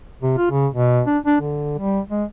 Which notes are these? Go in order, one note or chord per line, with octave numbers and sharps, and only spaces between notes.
C3
F4
C#3
B2
D4
D4
D3
G3
G#3